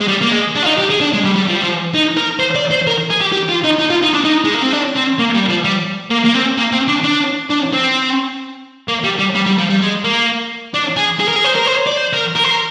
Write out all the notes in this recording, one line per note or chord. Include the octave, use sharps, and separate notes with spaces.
G#3
G3
A#3
G#3
D4
F4
D#4
G4
G#4
D4
G#3
G3
G3
F3
G3
F3
D#4
A#4
C5
D5
C5
A#4
G#4
G4
G4
F4
D#4
D#4
F4
D#4
D4
D#4
G#3
A#3
C4
D4
C4
A#3
G3
F3
G3
A#3
A#3
C4
A#3
C4
D4
D4
D4
C4
A#3
G3
G3
G3
G3
F3
G3
G#3
A#3
D4
G#4
G#4
A#4
G#4
C5
A#4
C5
D5
C5
A#4
A#4
C5
A#4